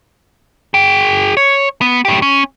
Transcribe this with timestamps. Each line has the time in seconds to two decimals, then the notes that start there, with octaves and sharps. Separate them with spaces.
0.74 G#4 G5
1.37 C#5
1.81 B3
2.05 A2 G4
2.22 C#4